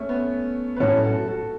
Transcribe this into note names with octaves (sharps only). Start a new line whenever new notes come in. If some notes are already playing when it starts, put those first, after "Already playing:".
Already playing: A3 C#4
B3
B4
A2 F#3 C#4 E4 F#4 A4
F#4 A4
F#4 A4